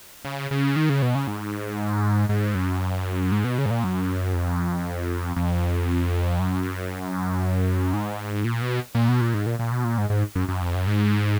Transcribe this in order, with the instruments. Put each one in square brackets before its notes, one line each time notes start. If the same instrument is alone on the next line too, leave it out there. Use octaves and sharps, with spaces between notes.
[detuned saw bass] C#3
C#3
D#3
C#3
B2
C#3
G#2
G#2
F#2
G#2
B2
C#3
G#2
A#2
F#2
F2
F2
F#2
G#2
A#2
B2
A#2
B2
A#2
G#2
A#2
A#2
B2
A#2
G#2
G#2
F#2
F#2
F2
F#2
G#2